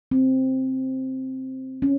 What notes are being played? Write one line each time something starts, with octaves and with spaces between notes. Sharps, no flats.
C4
C#4